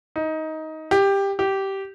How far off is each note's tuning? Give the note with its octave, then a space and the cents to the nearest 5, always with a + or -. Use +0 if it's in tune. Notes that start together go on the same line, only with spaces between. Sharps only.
D#4 +15
G4 +10
G4 -15